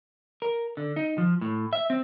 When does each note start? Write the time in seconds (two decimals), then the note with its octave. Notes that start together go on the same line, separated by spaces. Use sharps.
0.42 A#4
0.77 D3
0.96 D#4
1.18 F3
1.41 A2
1.73 E5
1.90 C4